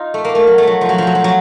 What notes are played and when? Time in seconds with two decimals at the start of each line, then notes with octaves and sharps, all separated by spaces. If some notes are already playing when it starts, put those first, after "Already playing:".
Already playing: D#4 F4
0.14 A3
0.25 A#3
0.35 A3
0.47 F#3
0.58 A3
0.67 F#3
0.81 F3
0.89 F#3
0.98 F3
1.07 F#3
1.15 F3
1.24 F#3